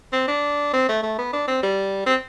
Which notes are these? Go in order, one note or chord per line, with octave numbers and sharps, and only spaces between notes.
C4
D4
C4
A3
A3
B3
D4
C4
G3
C4